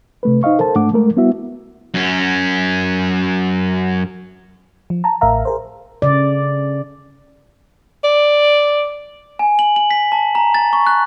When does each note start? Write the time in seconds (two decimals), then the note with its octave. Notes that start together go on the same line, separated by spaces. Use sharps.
0.23 C3 A3 B4
0.43 D#4 C5 D#5 F5 C#6
0.59 A4 A#4 C5 A5
0.75 G#2 A3 D4 F#5 D6
0.93 G#3 A3 A#4
1.16 G3 B3 E4 F#4 E5
1.94 F#2 C#4
4.90 F3
5.04 A5 A#5
5.21 A1 A2 A#4 E5 F5 A#5
5.45 G#4 A#4 C5
6.02 C#3 D5
8.04 D5
9.39 G#5
9.59 F#7
9.76 F#7
9.91 B6
10.12 A5
10.35 A#5
10.55 A6
10.73 C#6
10.87 F#6